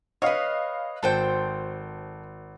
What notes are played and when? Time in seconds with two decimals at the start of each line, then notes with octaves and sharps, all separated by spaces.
0.22 B4 C#5 D#5 F5
1.03 G#1 A4 C5 G5